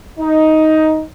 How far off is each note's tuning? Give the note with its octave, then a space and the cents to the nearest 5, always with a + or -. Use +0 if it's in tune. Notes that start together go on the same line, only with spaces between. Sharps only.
D#4 +10